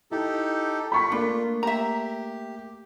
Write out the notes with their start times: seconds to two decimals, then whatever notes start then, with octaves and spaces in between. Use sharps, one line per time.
0.11 D#4 E4 G4 A4
0.92 F4 B5 C#6 B6
1.12 A3 A#3 D4
1.63 G4 E5 A#5